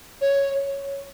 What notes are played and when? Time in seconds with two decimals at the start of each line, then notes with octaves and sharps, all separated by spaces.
0.21 C#5